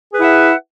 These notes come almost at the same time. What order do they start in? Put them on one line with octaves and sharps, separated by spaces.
G#4 B4 F#5 E4 E5